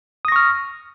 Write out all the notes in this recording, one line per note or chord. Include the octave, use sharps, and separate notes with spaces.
C#6 D#6 F6 A#6